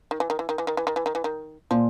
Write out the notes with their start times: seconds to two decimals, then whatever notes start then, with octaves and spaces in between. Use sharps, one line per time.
0.11 D#3
0.20 E3
0.30 D#3
0.39 E3
0.49 D#3
0.58 E3
0.67 D#3
0.77 E3
0.87 D#3
0.96 E3
1.06 D#3
1.15 E3
1.24 D#3
1.71 A#2 F3